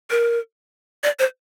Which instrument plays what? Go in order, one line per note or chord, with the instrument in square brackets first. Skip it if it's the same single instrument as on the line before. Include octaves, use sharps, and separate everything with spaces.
[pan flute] A#4
D5
C5